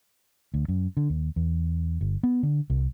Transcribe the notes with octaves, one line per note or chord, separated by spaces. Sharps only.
D2
F#2
D3
D#2
E2
G1
B3
D3
C2